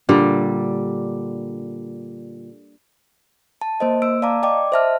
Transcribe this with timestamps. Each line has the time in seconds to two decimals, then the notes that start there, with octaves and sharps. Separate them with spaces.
0.09 A#2 D3 G3
3.62 A5
3.80 A#3 C5 D#5
4.02 A#3 E6 D7
4.22 D5 F5 A5 A#5 D6
4.43 D5 D#5 G5 D6
4.72 C5 D#5 E5 A5 F6